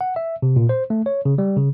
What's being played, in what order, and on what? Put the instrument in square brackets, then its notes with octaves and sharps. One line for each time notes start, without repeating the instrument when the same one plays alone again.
[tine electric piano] F#5
E5
C3
A#2
C5
A3
C#5
C#3
G3
C#3